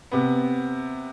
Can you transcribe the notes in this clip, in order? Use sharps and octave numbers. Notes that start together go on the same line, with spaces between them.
C3 B3